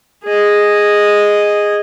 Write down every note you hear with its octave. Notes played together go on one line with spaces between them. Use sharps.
G#4 D#5